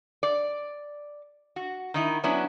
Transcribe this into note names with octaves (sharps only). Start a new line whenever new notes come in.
D5
F#4
D#3 D#4 E4
F#3 B3 C#4 D4 E4